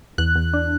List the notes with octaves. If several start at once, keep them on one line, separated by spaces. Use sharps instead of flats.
E2 F#6
E2
D4